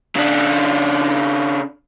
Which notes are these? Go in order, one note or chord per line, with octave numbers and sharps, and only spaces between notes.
C#3 D4